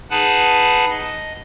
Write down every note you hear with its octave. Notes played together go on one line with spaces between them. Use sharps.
D#4 G#4 B4 F#5 A5 B5
D#5